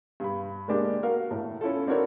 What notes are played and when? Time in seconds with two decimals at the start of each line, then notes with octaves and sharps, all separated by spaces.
0.20 G2 B5
0.68 G#3 A#3 D4 G4
1.03 F#4 A#4 F5
1.31 A2
1.61 C#4 E4 F4 A4
1.87 C4 D4 E4 F#4 A#4 C#5